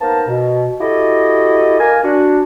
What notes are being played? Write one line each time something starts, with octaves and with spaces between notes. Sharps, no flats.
A#3 B3 D#4 A#4 C5 A5
B2
E4 F#4 G4 A4 D#5
A#3 A#4 G#5
D4 F#4